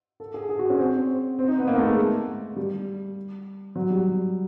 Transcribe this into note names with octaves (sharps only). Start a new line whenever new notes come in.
A4
G#4
G#4
F#4
C#4
C4
C4
D#4
B3
A#3
A3
G#3
G3
F#3
G3